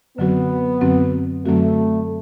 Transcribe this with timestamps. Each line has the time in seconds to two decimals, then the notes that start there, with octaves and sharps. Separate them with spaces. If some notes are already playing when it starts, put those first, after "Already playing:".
0.18 F#2 D3 F#3 B3 C4 F#4
0.81 F#2 D3 F#3 C4 F#4
1.45 F#2 D3 F#3 A3 C4 F#4